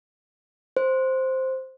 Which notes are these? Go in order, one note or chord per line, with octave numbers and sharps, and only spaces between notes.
C5